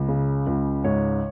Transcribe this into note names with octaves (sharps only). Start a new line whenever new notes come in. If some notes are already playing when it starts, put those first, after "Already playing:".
Already playing: C#2
C#3
C#2
G#2 C#5